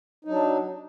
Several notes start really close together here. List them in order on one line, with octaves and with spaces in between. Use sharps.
D#4 F#3 D4